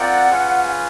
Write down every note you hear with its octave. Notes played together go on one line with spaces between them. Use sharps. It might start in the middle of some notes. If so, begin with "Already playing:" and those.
Already playing: C4 F4 A#4 D5 F#5 G5
C#4 F4 G#4 B4